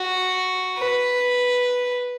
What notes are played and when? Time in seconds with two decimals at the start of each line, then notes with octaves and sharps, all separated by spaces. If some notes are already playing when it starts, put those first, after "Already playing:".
Already playing: F#4
0.78 B4